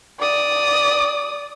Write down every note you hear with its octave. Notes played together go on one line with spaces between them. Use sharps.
D5 D#6